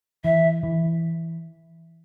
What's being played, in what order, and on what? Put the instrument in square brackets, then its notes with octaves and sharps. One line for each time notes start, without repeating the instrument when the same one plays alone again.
[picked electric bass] E3 [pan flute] E5
[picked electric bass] E3